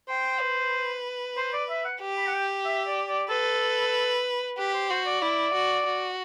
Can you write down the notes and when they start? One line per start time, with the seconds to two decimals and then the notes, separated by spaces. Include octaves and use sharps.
0.09 C5 G5
0.41 B4
1.37 C5
1.53 D5
1.69 E5
1.85 F#5
2.01 G4
2.17 B5
2.27 F#5
2.33 G5
2.65 E5
2.87 D5
3.08 D5
3.29 A4 B4
4.58 G4 B4
4.74 C5
4.90 F#4 C5
5.06 D5
5.21 E4 D5
5.54 F#4
5.86 F#4